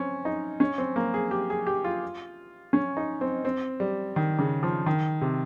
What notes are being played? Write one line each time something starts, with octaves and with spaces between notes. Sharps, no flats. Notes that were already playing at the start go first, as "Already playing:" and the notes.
Already playing: C4 C#4
D#4
C#4
C4
A#3
G#4
G4
G#4
G4
F4
C#4
D#4
C4
C4
G3
D#3
C#3
F3
D#3
C3